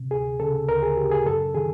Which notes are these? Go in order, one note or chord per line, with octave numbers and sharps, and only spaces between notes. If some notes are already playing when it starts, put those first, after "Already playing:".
Already playing: C3
D2 G#4
C#3 A4
D2 A#4
G#4
C#3 G4
G#4
F#2 A4
D#3 G#4